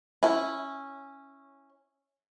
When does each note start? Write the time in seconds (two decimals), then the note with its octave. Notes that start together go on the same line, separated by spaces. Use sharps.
0.23 C#4 E4